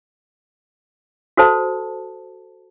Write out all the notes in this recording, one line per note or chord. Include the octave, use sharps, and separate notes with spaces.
F#4 A4 C5 A5